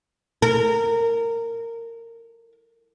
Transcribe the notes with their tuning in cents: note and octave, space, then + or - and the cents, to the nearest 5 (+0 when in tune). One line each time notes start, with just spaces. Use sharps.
A#4 -15